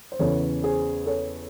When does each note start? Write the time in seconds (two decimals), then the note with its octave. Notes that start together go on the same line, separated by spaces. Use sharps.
0.12 C5
0.19 E2 C#3 E3 A4 C#5
0.63 G#4 C5
1.06 A4 C#5